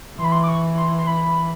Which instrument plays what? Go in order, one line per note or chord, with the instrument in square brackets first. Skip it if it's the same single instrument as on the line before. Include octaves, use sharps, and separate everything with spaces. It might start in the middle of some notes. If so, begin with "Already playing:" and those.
[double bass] E3 [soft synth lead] C6
[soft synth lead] B5
C6
D6
C#6
C6
C6
B5